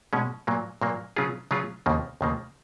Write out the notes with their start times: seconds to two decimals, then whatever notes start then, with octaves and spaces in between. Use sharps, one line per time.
0.13 B2 G#3 C#4
0.47 A#2 F#3 A#3
0.81 A#2 F#3 A#3
1.16 C#3 F#3 C#4 F4 G#4
1.51 C#3 F#3 C#4 F4 G#4
1.86 D#2 C#3 F3 A#3
2.21 D#2 C#3 F3 A#3